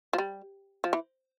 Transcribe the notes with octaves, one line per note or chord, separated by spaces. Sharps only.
F3
G3
F3
E3